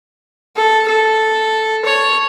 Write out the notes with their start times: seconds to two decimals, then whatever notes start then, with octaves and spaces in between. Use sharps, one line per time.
0.56 A4
0.88 A4
1.85 C#5